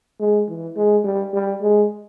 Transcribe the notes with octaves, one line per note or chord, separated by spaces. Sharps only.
G#3
E3
G#3
G3
G3
G#3